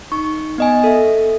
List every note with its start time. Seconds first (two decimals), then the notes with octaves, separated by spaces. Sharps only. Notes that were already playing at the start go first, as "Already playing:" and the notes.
0.12 D#4 C#6
0.58 B3 D#5 G#5
0.84 A4 E5